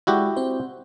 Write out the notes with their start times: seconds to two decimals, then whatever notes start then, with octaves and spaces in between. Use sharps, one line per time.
0.07 G#3 E4 F#4 G4 D5
0.37 C4 C5